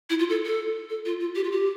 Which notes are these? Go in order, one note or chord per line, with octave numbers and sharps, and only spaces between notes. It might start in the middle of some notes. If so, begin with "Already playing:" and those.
E4
F4
A4
A4
A4
F4
F4
G4
F4
G4